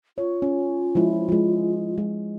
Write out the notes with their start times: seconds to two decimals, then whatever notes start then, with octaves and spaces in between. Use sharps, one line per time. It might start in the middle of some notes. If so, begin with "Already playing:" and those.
0.18 F4 C#5
0.42 C#4
0.95 F3 G#3 E4
1.29 F3 G#3
1.98 G#3